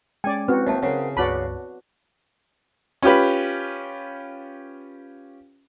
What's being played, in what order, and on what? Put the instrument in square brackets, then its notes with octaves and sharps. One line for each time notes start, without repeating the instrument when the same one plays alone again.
[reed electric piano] G#3 C#4 [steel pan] D5 G#5 [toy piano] G5
[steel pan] C4 F#4 [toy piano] E4 B4
[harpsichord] D#2 [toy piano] D#5 E5 A5
[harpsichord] C#3 [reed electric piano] A#4 C5 F#5
[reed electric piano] C#2 G2 [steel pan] F#4 D5 B5 [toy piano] B4 C#5 A5
[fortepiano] C#4 F4 G4 B4